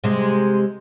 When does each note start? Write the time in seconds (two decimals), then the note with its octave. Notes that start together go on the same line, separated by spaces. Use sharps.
0.04 C3 G#3